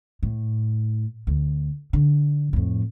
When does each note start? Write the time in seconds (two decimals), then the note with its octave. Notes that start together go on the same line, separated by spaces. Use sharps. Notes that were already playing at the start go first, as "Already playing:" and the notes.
0.23 A2
1.27 D2
1.93 D3
2.53 F2 A2